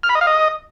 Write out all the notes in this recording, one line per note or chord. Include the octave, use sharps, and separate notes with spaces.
F6
B5
D#5
F5
D#5